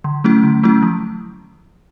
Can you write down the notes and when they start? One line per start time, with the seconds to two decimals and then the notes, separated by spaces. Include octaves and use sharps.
0.04 D3
0.24 F#3 A3 C#4 E4
0.44 D3
0.63 F#3 A3 C#4 E4
0.83 F3